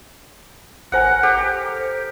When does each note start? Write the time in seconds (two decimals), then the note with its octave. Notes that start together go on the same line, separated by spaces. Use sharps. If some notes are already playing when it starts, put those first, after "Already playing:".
0.92 A1 A#4 C5 F#5 G#5
1.23 G4 A4 C5